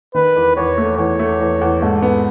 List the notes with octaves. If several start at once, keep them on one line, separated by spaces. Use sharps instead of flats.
D#3 B4
E2
E2 C#5
A3
E2 C#5
A3
E2
E2
G#2 A4
B3